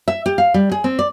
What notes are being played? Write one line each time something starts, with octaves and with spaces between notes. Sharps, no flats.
E5
G4
F5
G3
G#4
C4
D5